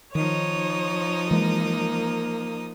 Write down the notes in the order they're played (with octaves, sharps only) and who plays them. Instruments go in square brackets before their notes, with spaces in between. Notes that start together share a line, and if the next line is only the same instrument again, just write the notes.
[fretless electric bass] D#3 [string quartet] F3 D#4 D#6 [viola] C#5
[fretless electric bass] E3 G#3 [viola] A#3